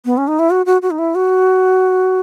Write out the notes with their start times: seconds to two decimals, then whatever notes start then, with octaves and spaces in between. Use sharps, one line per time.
0.05 B3
0.17 C#4
0.28 D#4
0.39 E4
0.50 F#4
0.66 F#4
0.82 F#4
0.91 D#4
0.98 E4
1.15 F#4